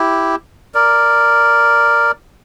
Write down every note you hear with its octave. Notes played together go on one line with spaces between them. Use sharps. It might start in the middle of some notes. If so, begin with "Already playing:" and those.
Already playing: E4 G4
A#4 D5